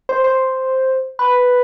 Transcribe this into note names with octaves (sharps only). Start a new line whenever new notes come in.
C5
C5
B4